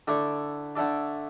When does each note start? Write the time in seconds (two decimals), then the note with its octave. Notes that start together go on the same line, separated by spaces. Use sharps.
0.07 D3 A3 E4 A4 D5
0.76 D3 A3 E4 A4 D5